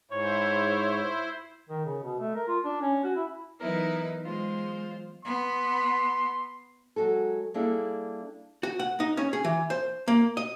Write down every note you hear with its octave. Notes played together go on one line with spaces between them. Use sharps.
G#2 E4 C5 C#5
D#3
C#3
B2
A3
A#4
F4
D4
C#4
F#4
E4
E3 F#3 B3 D#4 E4 A#4 B4
G#3 F4 C5
B3 C6
F#3 G#3 F#4 A4
G3 A#3 D4 E4 G#4 A4
F#4
F#5
D#4
C#4
G#4
E3
C5
A#3
D#5